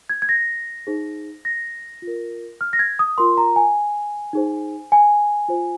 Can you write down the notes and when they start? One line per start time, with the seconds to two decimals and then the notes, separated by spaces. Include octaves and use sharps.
0.10 G#6
0.22 G#6
0.29 A#6
0.87 D#4 G#4 C5
1.45 A#6
2.02 F4
2.07 A#4
2.61 F6
2.73 A#6
2.79 G#6
2.99 D#6
3.18 F4 A#4 C6
3.37 A#5
3.56 G#5
4.33 D#4 G#4 C5
4.92 G#5
5.48 F4 C5